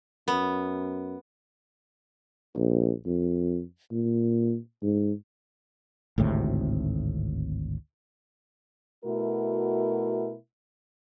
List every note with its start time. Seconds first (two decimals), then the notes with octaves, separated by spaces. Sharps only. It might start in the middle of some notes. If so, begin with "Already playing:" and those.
0.28 F#2 B3
2.56 A#1
3.06 F2
3.92 A#2
4.82 G#2
6.18 G#1 D2 A2 C3
9.05 B2 A3 E4 F#4 A#4